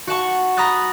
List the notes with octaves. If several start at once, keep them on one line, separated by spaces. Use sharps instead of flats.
F#4 F#5 A5 C#6
A#5 B5 D#6 F#6 A6